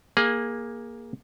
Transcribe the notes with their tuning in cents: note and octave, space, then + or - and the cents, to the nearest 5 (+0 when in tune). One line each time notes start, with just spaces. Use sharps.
A#3 +10 G#4 -10